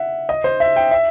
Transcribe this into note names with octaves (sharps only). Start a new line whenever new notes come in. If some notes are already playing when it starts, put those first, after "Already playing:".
Already playing: E5 F#5
D#5
C5
E5
G5
E5